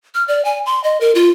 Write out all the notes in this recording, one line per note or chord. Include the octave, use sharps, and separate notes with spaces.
F6
D5
G#5
C6
D#5
A#4
F4